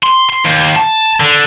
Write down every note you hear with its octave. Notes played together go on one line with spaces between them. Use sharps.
C6
C6
D#2
A5
D3